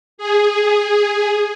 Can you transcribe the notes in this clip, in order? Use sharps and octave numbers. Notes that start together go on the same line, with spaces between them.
G#4